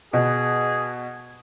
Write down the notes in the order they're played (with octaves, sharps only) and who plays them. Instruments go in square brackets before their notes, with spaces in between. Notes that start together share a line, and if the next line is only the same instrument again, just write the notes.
[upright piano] B2 [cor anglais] G#4